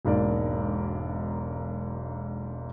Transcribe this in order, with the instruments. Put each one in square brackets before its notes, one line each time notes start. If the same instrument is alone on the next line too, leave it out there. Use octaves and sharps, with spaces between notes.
[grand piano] E1 B1 G#2 A#3 D4 D5